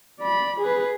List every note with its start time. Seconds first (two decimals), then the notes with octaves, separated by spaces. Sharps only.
0.19 D5 B5
0.60 G#4 B4